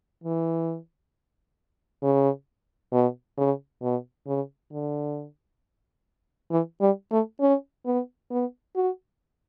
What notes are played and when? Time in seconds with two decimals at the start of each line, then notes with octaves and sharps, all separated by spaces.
0.24 E3
2.03 C#3
2.92 B2
3.38 C#3
3.82 B2
4.27 C#3
4.72 D3
6.51 E3
6.81 G3
7.11 A3
7.40 C#4
7.86 B3
8.30 B3
8.75 F#4